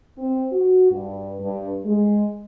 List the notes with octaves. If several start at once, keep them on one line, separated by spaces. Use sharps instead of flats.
C4
F#4
G2
G2
G#3